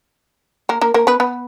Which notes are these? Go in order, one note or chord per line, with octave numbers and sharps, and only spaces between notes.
A#3 A#4
A#3 A#4
A#3 A#4
B3 B4
B3 B4